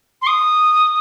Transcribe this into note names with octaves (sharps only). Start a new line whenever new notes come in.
C6
D#6